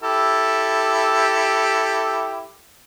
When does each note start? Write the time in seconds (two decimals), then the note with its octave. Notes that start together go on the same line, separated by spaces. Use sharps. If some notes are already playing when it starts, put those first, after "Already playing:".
0.03 E4 G4 A4